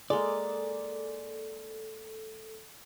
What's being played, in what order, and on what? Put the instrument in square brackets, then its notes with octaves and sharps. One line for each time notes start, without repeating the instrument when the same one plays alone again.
[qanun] G#3 A#3 [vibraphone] A4 [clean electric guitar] D5